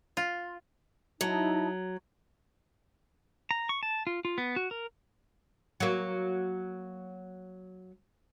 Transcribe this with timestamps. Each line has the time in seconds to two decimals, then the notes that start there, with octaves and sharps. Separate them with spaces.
0.17 F4
1.21 F#3 D#4 E4 A5
3.51 A#5
3.69 C#6
3.83 A5
4.07 F4
4.25 F4
4.38 B3
4.56 F#4
4.71 A#4
5.80 F#3 A#3